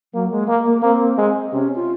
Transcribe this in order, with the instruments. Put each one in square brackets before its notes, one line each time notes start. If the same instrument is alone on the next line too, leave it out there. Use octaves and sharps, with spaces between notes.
[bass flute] F#3 [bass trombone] A#3
[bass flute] G#3
[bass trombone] A#3
[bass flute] A#3
[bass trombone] A#3 [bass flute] C4
[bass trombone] G#3
[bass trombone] C3 [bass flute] C#4
[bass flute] F4